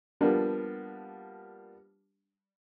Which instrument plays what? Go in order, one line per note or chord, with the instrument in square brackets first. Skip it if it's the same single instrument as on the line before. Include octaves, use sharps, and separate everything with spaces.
[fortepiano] F3 G3 A#3 B3 D4